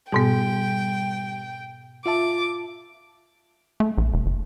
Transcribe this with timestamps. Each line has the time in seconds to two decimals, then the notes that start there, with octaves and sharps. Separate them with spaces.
0.12 G#2 B2 G3 B3 G5
2.06 F4 E5 A5 D6
3.80 A3
3.98 A#1
4.14 E1
4.26 F#1